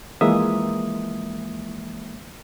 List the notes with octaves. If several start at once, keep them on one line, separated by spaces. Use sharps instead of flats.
E3 F3 G#3 A#3 E5 D#6